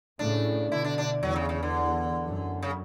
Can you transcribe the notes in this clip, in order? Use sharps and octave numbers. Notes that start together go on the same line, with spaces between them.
A2 C#3 D4
B2 D3 E4
D4
D4
E2 F#3
C#3
C#3
D3
F#2
C#3